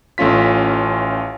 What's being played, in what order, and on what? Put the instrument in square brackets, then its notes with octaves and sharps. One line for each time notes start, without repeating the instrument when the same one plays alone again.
[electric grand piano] A1 A3 C#4 F4 B6